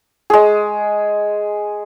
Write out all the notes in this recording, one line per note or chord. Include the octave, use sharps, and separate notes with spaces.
G#3 G#4